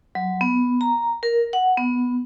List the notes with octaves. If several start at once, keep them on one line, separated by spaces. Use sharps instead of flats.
F#3
B3
A#5
A#4
F#5
B3